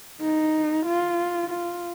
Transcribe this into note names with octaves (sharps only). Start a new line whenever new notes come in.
D#4
F4
F4